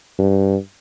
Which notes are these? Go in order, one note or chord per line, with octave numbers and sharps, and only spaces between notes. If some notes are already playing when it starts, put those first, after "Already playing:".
G2